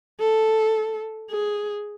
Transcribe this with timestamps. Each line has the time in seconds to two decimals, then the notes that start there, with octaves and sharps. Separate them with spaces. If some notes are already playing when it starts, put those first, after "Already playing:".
0.20 A4
1.31 G#4